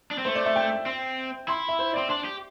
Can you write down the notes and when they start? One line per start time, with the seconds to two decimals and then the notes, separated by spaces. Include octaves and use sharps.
0.11 D4
0.18 C4
0.25 A3 C5
0.35 D5
0.46 E5
0.56 G5
0.86 C4
1.48 E4 C6
1.68 E5
1.79 C5
1.94 C4 D5
2.10 D4 C6
2.25 G4